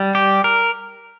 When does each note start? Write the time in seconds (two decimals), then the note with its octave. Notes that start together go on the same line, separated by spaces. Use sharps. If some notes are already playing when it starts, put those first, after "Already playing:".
Already playing: G3
0.15 G4
0.44 A#4